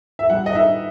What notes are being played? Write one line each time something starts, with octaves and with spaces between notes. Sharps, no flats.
E5
G3 F#5
D#5
D#4 E5